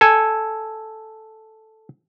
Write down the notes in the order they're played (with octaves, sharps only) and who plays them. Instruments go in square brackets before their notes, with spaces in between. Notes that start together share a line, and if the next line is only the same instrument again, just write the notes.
[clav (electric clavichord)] A4 G#5